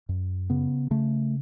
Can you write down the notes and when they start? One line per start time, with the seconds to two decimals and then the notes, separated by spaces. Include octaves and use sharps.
0.09 F#2
0.50 C#3 B3
0.91 C#3 A3